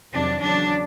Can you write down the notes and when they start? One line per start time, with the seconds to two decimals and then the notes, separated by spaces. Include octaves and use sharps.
0.13 F2 C3 D#3 F#3 D4
0.42 E2 C#3 F#3 D4